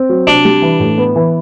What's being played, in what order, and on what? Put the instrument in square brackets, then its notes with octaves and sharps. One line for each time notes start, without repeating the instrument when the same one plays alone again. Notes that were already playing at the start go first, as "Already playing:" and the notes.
Already playing: [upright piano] C4
F#3
[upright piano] C3 [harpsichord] D4
[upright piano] G3
E3
A2
B3
E3